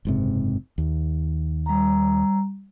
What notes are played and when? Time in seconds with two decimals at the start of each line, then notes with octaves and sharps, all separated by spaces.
0.05 F#1 G#2 C3
0.78 D#2
1.66 G3 A#5